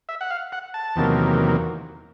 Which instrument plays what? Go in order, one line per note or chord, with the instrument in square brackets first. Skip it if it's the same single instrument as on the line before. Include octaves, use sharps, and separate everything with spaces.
[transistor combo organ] E5
F#5
F5
F#5
A5
E2 C3 D#3 F#3 A#3